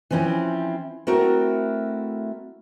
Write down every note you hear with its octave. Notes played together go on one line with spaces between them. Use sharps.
E3 F3 C4 C#4 E4
A3 C4 E4 F#4 A#4